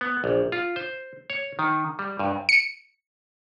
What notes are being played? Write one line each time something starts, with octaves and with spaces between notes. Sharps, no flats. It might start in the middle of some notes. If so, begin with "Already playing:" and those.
B3
A#1
F4
C5
C#5
D#3
G3
G2
C#7